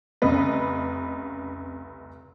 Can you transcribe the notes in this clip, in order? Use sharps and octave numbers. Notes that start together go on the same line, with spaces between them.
F1 C2 C#3 B4 D#5